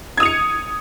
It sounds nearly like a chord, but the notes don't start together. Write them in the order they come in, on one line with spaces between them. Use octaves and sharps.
G#6 D#6 F7 C#7